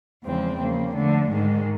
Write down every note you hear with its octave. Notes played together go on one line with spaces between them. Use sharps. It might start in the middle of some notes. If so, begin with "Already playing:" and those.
E2 C#3 F3 G#3 C4
C#3 F3 A#3
D3 F3 A3
G#2 D#3 G#3